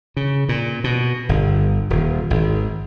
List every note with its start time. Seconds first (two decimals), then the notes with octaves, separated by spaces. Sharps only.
0.17 C#3
0.49 A#2
0.84 B2
1.29 G1
1.90 D#1
2.30 G#1